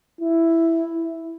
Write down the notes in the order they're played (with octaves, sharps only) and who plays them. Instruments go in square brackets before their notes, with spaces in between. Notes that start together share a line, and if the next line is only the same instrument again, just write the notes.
[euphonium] E4